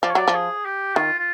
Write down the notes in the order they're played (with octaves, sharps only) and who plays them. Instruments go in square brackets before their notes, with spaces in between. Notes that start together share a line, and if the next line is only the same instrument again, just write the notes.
[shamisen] F3 [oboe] D5
[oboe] C#5
[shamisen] F#3 [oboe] D5
[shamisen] F3
[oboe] G#4
G4
[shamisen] D#3 [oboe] F4
[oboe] F4